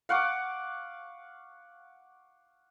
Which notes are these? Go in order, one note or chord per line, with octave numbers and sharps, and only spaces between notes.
F5 F#5 C#6 D6